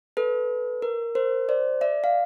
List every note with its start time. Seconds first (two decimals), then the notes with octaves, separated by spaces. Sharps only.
0.17 A4 B4
0.82 A#4
1.15 A#4 C5
1.49 C5 D5
1.81 D5 E5
2.04 F5